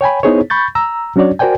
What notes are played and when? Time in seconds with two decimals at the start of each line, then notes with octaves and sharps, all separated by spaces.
0.01 C#5 G5 G#5 B5
0.23 B3 D#4 E4 G#4 C5 C#5
0.50 B5 C#6 G6 A6
0.75 A#5 E6
1.16 F#3 C#4 D4 F#4 C#5 D5
1.39 F#4 A#4 C5 D5 G5 G#5